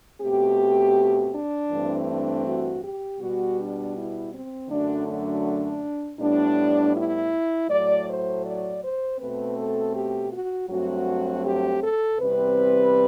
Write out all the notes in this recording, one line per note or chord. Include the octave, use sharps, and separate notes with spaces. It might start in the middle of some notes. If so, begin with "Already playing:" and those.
B2 A3 C4 G4
D4
G2 E3 A3 C4
D4
F#4
G4
B2 G3 B3 F#4
D4
E4
C4
F#2 D3 F#3 A3 D4
D4
A2 G3 B3 D4
E4
A2 F#3 A3 D5
C5
D5
C5
B2 A3 C4 B4
A4
G4
F#4
G2 F#3 A3 C4 F#4
G4
A4
E2 C3 G3 C4 B4